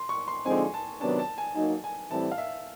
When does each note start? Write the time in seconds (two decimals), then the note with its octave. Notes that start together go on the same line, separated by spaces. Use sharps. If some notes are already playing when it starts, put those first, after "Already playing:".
Already playing: C6
0.09 C#6
0.28 C6
0.46 D3 F3 G#3 C4 D#4 G#5
0.74 A5
1.01 C3 D#3 F#3 B3 D4 A5
1.19 A5
1.38 G#5
1.56 F#3 A#3 D#4 G#5
1.84 G#5
2.10 A2 E3 G3 C4 E4 A5
2.32 F5
2.38 E5